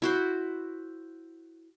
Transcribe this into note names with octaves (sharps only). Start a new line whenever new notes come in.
E4 F#4 C5